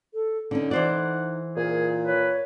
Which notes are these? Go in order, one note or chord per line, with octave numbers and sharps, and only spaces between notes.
A4
D3 C#4 D#4
E3 C5 D5 F#5
A#2 G#4 A#4
B4 C#5